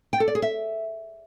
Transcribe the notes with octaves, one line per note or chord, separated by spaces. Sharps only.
G5
A4
D5
G#4
E5